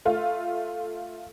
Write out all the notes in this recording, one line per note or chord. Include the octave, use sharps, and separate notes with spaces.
A3 F4